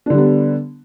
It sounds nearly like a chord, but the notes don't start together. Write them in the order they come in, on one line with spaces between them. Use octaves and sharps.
D4 D3 G3 B3